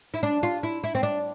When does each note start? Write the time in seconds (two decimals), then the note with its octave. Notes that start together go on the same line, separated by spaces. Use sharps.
0.14 E4
0.23 D4
0.43 F4
0.63 E4
0.84 E4
0.95 C4
1.03 D4